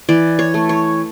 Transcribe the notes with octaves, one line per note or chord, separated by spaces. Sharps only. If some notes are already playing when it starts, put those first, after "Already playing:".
E3 D5
C#5
A3
C#5